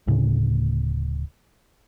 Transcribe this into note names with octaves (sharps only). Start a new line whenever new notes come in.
D1 A2 C#3